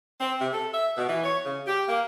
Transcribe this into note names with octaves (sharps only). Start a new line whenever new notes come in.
C4
C3
A4
E5
B2
E3
C#5
C#3
G4
A#3